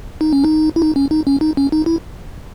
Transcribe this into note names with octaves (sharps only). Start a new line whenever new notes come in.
D#4
C#4
D#4
E4
D#4
C#4
D#4
C#4
D#4
C#4
D#4
E4